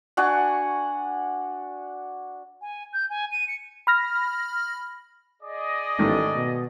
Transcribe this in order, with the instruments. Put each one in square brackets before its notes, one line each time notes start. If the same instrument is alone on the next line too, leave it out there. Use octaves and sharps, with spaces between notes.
[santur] D4 F#4 F#5 G#5
[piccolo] G#5
G6
G#5
D#7
C#7
[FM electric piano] B5 F6 A#6
[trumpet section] G#4 D5 D#5
[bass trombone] A1 [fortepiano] G#2 D#3 A3
[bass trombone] B2